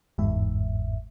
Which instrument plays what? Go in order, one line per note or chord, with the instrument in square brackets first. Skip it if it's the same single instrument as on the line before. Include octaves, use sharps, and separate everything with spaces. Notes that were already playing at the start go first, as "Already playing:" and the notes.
[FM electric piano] G1 E2 G#2 E5